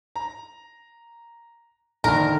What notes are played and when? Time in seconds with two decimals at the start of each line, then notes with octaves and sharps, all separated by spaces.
0.16 A#5
2.04 A#1 D3 D#3 A#4